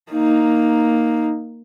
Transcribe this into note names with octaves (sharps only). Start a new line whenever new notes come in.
A#3 D#4